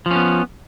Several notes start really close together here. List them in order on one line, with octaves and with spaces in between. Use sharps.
F3 C#4 B3